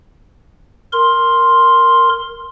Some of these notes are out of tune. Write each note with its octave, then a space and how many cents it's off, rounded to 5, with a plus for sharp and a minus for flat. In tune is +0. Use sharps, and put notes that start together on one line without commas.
A#4 +0 C6 +5